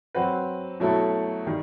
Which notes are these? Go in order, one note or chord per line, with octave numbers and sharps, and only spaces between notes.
F#3 C4 F#4 B4
B2 F#3 A3 E4 A4
D#3 G3